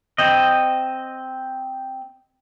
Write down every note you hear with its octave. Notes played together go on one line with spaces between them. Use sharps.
C4 D#5